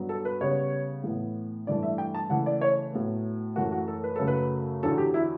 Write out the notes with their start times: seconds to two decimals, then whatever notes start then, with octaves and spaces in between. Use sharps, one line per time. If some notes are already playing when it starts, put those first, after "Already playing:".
Already playing: G2 F#3 B3
0.09 A4
0.25 B4
0.41 C#3 G3 B3 C#5
1.04 A2 E3 B3
1.67 G2 E3 A3 D5
1.83 E5
1.98 G5
2.15 A5
2.30 C#3 E3 A3 F#5
2.46 D5
2.61 C#5
2.93 A2 F#3 B3
3.56 F#2 E3 A3 F#4
3.72 F#4
3.88 A4
4.04 B4
4.16 F#2 C#3 F#3 A3 A4
4.28 B4
4.83 E2 D3 F#3 A4
4.98 G4
5.14 E4